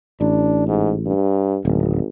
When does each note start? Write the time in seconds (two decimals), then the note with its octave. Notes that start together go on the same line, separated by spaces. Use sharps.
0.21 A1 D4
0.67 G#2
1.06 G2
1.65 D1 G#1